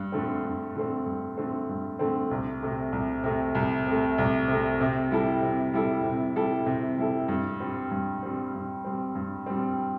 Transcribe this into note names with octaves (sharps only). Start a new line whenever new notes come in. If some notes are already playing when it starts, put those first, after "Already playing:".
Already playing: G2
D3 A3 C4
G2
D3 A3 C4
G2
D3 A3 C4
G2
D3 A3 C4
C2
C3 A3
C2
C3 A3
C2
C3 A3
C2
C3 A3
C3
G3 E4 A4
C3
G3 E4 A4
C3
G3 E4 A4
C3
G3 E4 A4
G2
G3 C4
G2
G3 C4
G2
G3 C4
G2
G3 C4